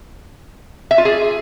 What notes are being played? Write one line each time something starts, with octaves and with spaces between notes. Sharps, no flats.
E5
F4
G#4